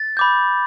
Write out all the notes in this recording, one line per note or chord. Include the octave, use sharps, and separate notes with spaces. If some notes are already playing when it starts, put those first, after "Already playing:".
Already playing: A6
B5 D6 G6